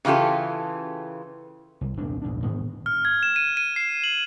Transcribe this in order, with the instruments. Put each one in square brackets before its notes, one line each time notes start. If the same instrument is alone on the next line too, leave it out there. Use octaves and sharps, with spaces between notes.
[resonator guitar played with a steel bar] C#3 E3 F4 G4 A4
[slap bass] C2
D#1 C2 G2 D4
A#1 E2 G#2 D4
G#2 D#3 E3 B3
[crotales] F6
G#6
E7
D#7
D#7
C7
F#7